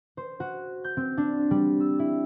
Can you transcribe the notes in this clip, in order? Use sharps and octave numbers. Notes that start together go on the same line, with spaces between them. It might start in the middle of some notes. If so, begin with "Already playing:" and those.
C5
F#4
G6
C4
D4
G3
E6
E4